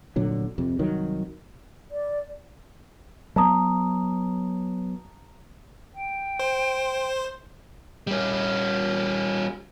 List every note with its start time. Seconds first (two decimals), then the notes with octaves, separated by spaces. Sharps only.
0.16 F1 A#2 D3 F#3
0.58 F2 C3
0.79 C2 D#3 F#3
1.91 D5
3.36 F#3 B3 A5 A#5 D#6
5.94 G5
6.39 C5
8.07 G3 C#4